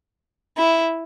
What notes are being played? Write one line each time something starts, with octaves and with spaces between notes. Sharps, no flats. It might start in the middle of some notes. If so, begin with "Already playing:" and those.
E4